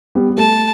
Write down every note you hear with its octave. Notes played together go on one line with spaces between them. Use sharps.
G3 B3
G3
A3 A5